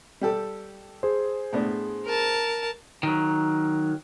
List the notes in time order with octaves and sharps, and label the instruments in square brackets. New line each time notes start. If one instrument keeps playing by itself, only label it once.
[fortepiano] G3 G4 A4
[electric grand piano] G#4 C5
[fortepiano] A2 B3 D4
[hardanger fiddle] A#4 A5
[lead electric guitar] D#3 F#3